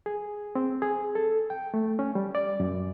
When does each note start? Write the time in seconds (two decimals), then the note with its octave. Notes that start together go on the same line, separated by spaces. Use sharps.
0.06 G#4
0.55 C4
0.82 G#4
1.15 A4
1.50 G5
1.74 A3
1.99 C#4
2.15 G3
2.35 D5
2.60 F#2